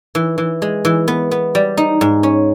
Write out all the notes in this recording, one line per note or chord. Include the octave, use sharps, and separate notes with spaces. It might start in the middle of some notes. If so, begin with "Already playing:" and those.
E3
E3
G#3
E3
B3
B3
G3
D#4
G#2
C#4